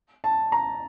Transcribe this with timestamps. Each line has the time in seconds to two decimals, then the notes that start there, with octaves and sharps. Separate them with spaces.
0.24 A5
0.52 A#5